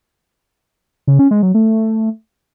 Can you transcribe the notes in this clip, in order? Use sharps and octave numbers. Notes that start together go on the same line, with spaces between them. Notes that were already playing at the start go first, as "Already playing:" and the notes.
C#3
C#4
G#3
F#3
A3